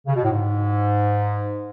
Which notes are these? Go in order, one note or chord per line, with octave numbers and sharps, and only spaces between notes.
C#3
B2
A2
G#2